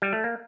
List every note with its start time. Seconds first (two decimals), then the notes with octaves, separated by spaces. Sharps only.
0.02 G3
0.13 A3
0.24 A#3